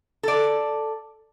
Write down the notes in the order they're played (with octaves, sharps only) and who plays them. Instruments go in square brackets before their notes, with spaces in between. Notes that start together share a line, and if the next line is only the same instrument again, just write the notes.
[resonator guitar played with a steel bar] A4 D5